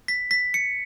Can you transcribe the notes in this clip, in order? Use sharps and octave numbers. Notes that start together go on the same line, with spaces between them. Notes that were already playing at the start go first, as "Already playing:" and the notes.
B6
B6
C#7